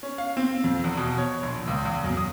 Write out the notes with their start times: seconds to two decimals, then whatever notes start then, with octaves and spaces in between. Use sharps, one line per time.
0.03 C#4
0.18 F5
0.37 C4
0.64 F2
0.84 E2
0.97 B2
1.18 C#5
1.43 A#1
1.67 C#2
1.85 E2
2.04 F#2
2.17 D#6